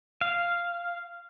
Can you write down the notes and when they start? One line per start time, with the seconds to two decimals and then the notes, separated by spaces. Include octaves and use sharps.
0.21 F5